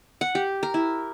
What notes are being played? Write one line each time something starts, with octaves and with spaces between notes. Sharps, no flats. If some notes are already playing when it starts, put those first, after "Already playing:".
F#5
G4
A#4
E4